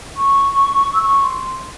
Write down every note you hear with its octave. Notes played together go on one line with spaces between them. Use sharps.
C#6
E6
C#6
C6